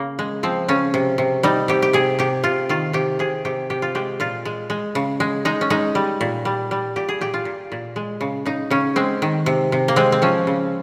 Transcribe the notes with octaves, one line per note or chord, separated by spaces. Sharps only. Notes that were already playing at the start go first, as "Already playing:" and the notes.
Already playing: C#3 A#3
G#3
F3 C4
C#3 C#4
C3
C3
G3 D#4
C3 G4
G4
C3 G#4
C3 G4
C3 F4
D#3 F4
C3 G4
C3 G#4
C3 G4
C3 G4
F4
G#3 G4
A#2 F4
G#3
G#3
C#3
G#3
G#3 D#4
C#4
G#3 D#4
G3
A#2
G3
G3
A#2 G4
G#4
A#2 G4
F4
A#2
A#2
G#3
C#3
C#3 D#4
C#3 C#4
G#3 C4
D#3
C3
C3
A#3
G#3 C4
C4
F3 C#4
C#3